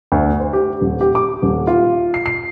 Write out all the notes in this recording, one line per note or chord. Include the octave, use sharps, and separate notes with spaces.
D2
C5
G4
D#1
G4
D6
D#1
F4
C7
C7